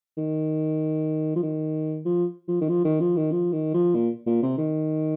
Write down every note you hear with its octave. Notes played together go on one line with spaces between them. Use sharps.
D#3
F3
D#3
F3
F3
D#3
F3
D#3
F3
D#3
F3
D#3
F3
A#2
A#2
C3
D#3